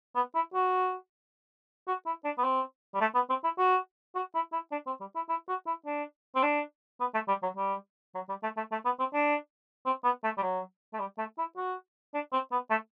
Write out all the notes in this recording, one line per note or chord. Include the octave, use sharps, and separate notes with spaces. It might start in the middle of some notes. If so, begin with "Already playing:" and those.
B3
E4
F#4
F#4
E4
D4
B3
C4
G3
A3
B3
C4
E4
F#4
F#4
E4
E4
D4
C4
G3
E4
E4
F#4
E4
D4
C4
D4
B3
A3
G3
F#3
G3
F#3
G3
A3
A3
A3
B3
C4
D4
C4
B3
A3
G3
F#3
A3
G3
A3
E4
F#4
D4
C4
B3
A3